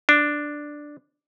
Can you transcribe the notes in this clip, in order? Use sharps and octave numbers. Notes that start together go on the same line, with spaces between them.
D4